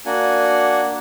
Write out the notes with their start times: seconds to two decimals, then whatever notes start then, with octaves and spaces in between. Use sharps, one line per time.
0.06 A#3 D4 F#4 F#5 G#5